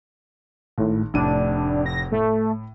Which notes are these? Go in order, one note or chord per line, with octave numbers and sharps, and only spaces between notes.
G#1 A2
F1 A2 D4 D#7
A#6
A2 A3